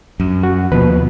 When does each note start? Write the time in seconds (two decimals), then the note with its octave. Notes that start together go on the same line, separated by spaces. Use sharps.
0.20 F#2
0.43 F#4
0.72 D#2 B2 F3 B4